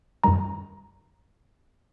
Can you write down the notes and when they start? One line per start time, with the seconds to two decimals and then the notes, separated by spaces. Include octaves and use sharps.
0.24 F#2 D#3 G3 A#5